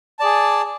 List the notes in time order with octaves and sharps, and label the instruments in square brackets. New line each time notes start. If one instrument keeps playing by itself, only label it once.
[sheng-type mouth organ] G#4 D5 A5